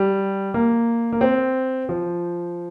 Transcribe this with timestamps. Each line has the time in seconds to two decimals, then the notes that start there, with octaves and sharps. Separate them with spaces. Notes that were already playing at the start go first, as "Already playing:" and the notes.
Already playing: G3
0.54 A#3
1.12 A#3
1.21 C4
1.89 F3